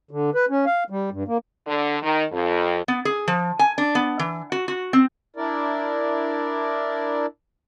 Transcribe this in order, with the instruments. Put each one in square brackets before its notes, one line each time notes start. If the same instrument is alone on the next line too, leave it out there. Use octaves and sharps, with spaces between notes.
[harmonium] D3
B4
C#4
F5
G3
G2
A#3
[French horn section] D3
D#3
F2
[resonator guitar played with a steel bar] B3
G#4
F3
G#5
D4
B3
E3
F#4
F#4
C4
[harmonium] D4 E4 A#4 D5